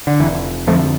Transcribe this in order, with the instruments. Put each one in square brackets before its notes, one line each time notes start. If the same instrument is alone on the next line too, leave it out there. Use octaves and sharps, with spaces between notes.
[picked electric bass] D3
F1 E3
F2 D3 F3 A3